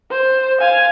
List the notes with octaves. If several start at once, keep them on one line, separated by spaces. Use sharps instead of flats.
C5
F5 G#5